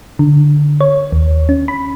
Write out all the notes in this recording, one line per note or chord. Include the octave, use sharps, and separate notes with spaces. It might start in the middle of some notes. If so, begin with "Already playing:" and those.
D3
C#5
D#2
C#4
B5